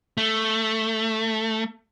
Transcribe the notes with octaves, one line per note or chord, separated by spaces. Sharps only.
A3